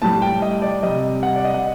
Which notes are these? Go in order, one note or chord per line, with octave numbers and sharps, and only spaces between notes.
A2 G3 A5
G5
D#5
D5
C3 G3 D#5
F#5
D5
D#5
F#5